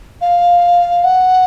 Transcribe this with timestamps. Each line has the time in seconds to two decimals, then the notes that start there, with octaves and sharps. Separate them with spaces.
0.21 F5
1.04 F#5